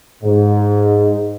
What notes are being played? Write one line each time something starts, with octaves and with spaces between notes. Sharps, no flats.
G#2